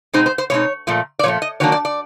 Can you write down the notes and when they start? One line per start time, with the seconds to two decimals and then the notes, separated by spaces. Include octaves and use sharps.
0.13 B2 G#3 C4 D#4 C5
0.26 C5
0.38 C5
0.50 B2 G#3 C4 D#4 C#5
0.87 A#2 F3 A3
1.19 D5
1.23 A#2 F3 A3 C#5
1.42 D#5
1.60 D#3 F#3 A#3 D4 C#5
1.72 D5
1.85 D5